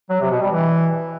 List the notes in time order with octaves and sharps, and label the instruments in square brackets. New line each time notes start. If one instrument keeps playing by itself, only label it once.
[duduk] F#3
C3
B2
G3
E3